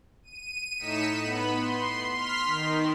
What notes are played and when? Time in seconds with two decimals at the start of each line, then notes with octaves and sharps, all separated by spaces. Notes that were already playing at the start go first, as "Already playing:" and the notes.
0.23 D#7
0.77 A2 D#4 B6 C#7 E7
1.20 B3 B5
1.58 C6
2.13 C6 F6 B6
2.46 D#3